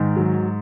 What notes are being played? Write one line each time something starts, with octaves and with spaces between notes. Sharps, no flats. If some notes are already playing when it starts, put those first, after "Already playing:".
Already playing: G#2 D#3
F#3